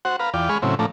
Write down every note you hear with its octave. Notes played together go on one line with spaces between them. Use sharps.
F#4 C5 F#5
B4 F5 A#5
E2 F4 D5 G5
G#3 G#4 B5 C#6 F6
A2 C#3 F#3 C4 E4
A2 F3 A3 D4 A#5